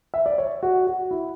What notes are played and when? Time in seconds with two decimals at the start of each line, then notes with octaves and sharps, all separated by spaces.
0.14 E5
0.26 D5
0.38 C#5
0.63 F#4
0.87 F#4
1.11 E4